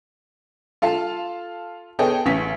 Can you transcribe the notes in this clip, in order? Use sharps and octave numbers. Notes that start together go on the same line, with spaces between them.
F4 A4 F5 A5
B3 G#4 A4 C#5 D#5 G5
A1 C#4 B6